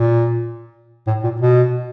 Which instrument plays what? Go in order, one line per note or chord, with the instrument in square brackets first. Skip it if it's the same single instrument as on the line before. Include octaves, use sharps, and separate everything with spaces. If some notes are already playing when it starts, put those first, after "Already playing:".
Already playing: [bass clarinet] A#2
A2
A#2
B2